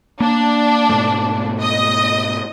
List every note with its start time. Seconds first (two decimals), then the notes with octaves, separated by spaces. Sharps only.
0.20 A#3 D4
0.89 G#2 B2 A3
1.61 D#5